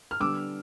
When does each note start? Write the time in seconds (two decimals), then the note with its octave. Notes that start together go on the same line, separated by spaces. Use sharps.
0.11 F6
0.20 D3 G3 B3 D4 D6 E6